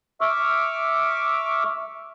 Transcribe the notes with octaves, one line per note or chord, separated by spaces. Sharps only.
E5 C#6 D6 E6 F6